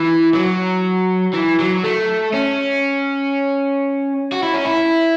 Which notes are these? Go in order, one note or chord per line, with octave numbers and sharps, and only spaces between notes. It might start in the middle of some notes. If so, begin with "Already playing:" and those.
Already playing: E3
F#3
E3
F#3
A3
C#4
F#4
E4
C#4
E4